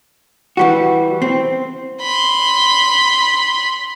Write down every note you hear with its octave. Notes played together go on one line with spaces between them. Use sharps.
E3 G3 F#4
C4
B5 C6